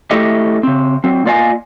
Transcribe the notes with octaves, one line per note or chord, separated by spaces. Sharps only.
A3 E4 G4 A4 D#5 E5
C#3 C4
F#3 C4
A#3 F4 D5 D#5 F5 G#5